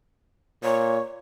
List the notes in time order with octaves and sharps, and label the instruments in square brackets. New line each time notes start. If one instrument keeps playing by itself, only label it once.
[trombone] A#2 [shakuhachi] C#5